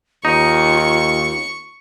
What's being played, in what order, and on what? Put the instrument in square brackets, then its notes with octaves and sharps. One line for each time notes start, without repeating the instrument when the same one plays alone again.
[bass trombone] D#2 [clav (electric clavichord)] D#4 [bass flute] F4 [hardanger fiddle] C#6